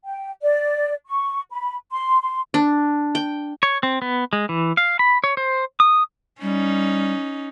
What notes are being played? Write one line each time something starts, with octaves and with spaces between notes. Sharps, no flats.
G5
D5
C#6
B5
C6
C6
D4
G5
C#5
C4
B3
G#3
E3
F5
B5
C#5
C5
D#6
G3 C#4 D#4